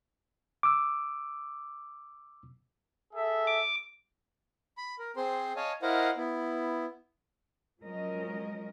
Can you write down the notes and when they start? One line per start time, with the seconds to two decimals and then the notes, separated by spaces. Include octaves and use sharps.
0.63 D6 E6
3.14 G#4 A4 E5
3.47 D6
4.78 B5
4.99 A#4
5.17 C4 G#4 C5 C6
5.56 C#5 D#5 F5 G#5 A5
5.82 E4 A#4 C5 D#5 F5 F#5
6.17 B3 E4
7.81 F3 F#3 G#3 C#4 A#4 D#5